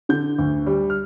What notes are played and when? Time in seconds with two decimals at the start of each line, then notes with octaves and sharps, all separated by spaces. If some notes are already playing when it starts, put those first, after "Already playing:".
0.09 D3 G6
0.39 D2
0.66 G3
0.90 F6